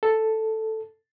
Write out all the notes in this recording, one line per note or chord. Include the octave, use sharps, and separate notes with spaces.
A4